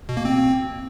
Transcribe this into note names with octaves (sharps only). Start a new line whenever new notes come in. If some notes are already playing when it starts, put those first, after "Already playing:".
B2
A#3
C4